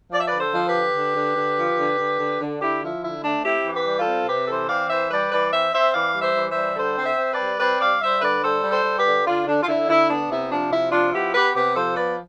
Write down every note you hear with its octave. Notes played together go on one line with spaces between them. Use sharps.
F3 D5
E5
B4 D5
D3
A4 C5
F3
G4 B4
D3
D3
D3
D3
F3
D3
D3
D3
D3
D3 E4 G4
F3 E4
D3 E4
A3 D4
C4 E4 G4
E3
G4 B4
G3
F4 A4
C4
C3 G4 B4
E3 A4 C5
C4 D5 F5
E3 C5 E5
G3 B4 D5
E3 B4 D5
C4 C5 E5
C4 C5 E5
E3 D5 F5
G3
C5 E5
E3
C5 E5
G3
D3 A4 C5
C4
C5 E5
C4
B4 D5
G3
C4 B4 D5
G3 D5 F5
G3 C5 E5
D3 B4 D5
G3 A4 C5
G3
A4 C5
G3
G4 B4
D3
D3 D4 F4
D3 D4
F4
D3 E4
D3 E4
B3 D4
C3 E4
F3 D4
C3 E4
F3 D4 F4
B3 E4 G4
B3 G4 B4
C3 G4 B4
F3 A4 C5
B3 B4 D5